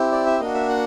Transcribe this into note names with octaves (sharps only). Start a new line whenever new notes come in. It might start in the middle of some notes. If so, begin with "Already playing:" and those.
Already playing: C4 E4 G4
D5
E5
A#3 D4 F#4 D#5
E5
F#5